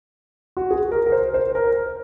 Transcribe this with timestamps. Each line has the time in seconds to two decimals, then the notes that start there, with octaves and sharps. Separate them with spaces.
0.57 F#4
0.71 G#4
0.91 A#4
1.06 A#4
1.12 C5
1.34 C5
1.55 A#4